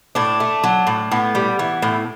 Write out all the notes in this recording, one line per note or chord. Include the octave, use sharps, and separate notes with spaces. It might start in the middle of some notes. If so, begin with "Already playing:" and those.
A2 D4
A3
F#3
A2
A2 B3
G3
E3
A2